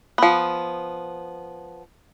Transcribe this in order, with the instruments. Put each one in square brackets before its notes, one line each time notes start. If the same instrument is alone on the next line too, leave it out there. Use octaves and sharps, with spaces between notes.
[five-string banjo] F3 B3